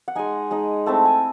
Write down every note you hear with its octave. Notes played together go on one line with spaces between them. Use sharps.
F#5
G#3 D#4 G#5
G#3 D#4
A3 C4 E4 A5
G#5